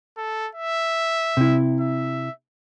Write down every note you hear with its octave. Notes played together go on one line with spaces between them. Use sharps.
A4
E5
C3 E4
E5